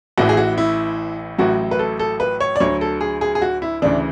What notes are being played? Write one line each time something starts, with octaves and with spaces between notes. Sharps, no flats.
A1 A2 E3 F#4
G#4
F#4
E4
A1 A2 F#3 F#4
B4
A4
A4
B4
C#5
D5
D2 D3 F#3 C#5
A4
G#4
G#4
G#4
F#4
E4
D2 C#3 E3 D4